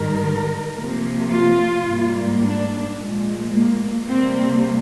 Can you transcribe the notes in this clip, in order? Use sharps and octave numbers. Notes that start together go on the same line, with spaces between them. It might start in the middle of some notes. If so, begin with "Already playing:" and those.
Already playing: G#2 D#3 G3 A#4
C3 F3 A#3
F4
G#2 G3 A#3
D4
A#2 F3 G#3
A#3
C3 G3 A#3 C4